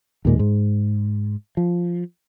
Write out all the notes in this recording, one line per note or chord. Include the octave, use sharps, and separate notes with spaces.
D#2 A#2 G#3
G#2
F3